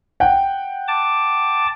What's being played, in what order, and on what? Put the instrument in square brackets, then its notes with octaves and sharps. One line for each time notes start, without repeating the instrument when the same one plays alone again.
[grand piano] F#5 G5
[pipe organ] A5 D6